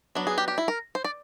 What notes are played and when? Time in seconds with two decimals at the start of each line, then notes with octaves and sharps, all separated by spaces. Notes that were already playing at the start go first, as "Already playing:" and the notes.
0.15 F#3 B3 D4
0.27 G#4
0.38 G4
0.48 G4
0.58 E4
0.68 A#4
0.95 C5
1.04 D5